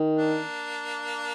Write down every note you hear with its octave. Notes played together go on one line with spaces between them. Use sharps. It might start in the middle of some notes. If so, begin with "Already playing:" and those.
Already playing: D#3
A#3 D4